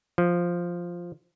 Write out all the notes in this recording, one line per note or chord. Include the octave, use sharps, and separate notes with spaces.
F3